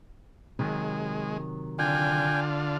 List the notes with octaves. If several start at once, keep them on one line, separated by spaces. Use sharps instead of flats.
C3 D#3 F#3 G#3
D3 F4 G5 G#5